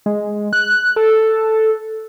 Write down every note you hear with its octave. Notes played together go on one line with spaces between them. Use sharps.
G#3
F#6
A4